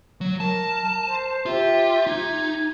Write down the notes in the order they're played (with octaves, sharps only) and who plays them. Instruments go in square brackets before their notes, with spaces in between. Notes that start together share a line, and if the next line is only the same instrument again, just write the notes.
[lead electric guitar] F#3
[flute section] A#4 [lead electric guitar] A5
[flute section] C5
[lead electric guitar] F4 [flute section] G4 E5
[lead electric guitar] D#4 [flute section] G#6